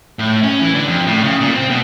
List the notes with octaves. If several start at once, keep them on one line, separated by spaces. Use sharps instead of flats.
A2
C#4
E3
D3
F2
A2
C#3
A#2
C4
B2